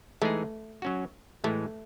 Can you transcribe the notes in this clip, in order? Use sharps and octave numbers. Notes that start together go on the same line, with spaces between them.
E3 G#3 A3 D#4 G#4
F#3 C#4 F#4
A2 E3 G#3 A3